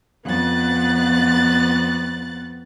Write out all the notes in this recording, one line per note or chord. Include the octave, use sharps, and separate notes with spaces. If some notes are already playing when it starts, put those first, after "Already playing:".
F2 B3 F#6 A6